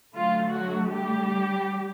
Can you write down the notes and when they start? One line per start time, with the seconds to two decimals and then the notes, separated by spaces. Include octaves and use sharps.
0.14 D3 F#3 A3 F4
0.52 F#3 F#4
0.90 G3 G4